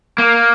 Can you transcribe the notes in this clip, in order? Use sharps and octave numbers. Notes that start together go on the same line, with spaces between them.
A#3